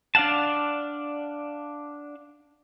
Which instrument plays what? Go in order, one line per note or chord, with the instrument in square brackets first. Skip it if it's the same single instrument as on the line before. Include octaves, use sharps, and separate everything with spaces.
[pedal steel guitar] D4 D5 F5 F#5 A5